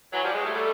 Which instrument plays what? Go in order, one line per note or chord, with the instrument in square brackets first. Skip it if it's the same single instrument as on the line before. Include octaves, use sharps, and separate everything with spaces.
[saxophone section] E3 F#3
F3 G3
F#3 G#3
G3 A3
G3 A3